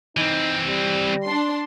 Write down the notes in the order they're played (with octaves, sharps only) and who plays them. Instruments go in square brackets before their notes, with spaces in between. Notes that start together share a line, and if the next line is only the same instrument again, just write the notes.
[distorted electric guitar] E3 C4 [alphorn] D#4
[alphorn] G3
[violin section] D4 C6